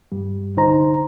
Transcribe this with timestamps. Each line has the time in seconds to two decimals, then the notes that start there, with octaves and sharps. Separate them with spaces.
0.12 G2 G3
0.57 C2 D3 D#4 C5 A#5